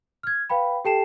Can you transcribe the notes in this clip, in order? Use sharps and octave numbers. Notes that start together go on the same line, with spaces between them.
F6 G#6
B4 F5 G5 B5
G4 A4 G5 A5 C7 E7